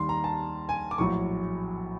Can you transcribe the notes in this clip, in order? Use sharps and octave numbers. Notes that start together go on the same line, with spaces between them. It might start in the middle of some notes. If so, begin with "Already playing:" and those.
Already playing: D#2 D#3 G3 C6
A#5
A5
G#5
D6
A#1 A2 F#3 C#6